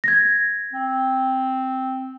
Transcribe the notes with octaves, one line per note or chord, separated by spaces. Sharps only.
G#6 A#6
C4